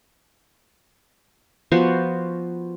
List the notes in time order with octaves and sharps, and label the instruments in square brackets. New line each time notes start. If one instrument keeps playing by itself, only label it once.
[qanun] F3 B3 F#4 C5